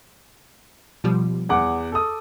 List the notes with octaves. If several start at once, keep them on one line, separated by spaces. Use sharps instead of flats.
B2 F3 G3
E2 F#5 D6
A4 D#6